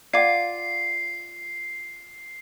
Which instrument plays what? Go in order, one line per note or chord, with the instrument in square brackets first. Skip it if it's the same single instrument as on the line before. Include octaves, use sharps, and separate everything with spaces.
[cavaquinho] F4 D6 [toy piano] D5 F5 F#5 [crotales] C7